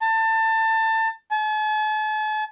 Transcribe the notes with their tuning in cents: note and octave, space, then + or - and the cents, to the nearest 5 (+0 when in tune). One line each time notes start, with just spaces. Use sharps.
A5 +25
A5 -45